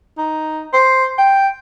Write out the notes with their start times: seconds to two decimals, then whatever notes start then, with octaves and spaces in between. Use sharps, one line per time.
0.18 D#4
0.73 C5
1.18 G5